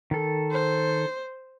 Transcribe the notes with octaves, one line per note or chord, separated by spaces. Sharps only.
D#3 A4
C5